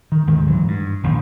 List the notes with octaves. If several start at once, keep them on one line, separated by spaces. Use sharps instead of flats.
D#3
D2 G#2 D#3
G#2 E3 F#3
G2
E1 A#1 A2 D#3